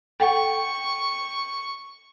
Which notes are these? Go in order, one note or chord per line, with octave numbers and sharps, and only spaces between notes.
A4 F#5 G5 C#6